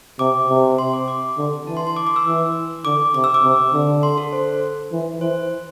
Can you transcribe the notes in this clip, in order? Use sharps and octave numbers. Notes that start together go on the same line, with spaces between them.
C3 D6
C3
C6
D6
D6
D3
E3 A5
C6
C6
D6
D6
E6
E3
D3 D6
C3 D6
E6
D6
C3
D3
C6
A4
C5
E3
E3 C5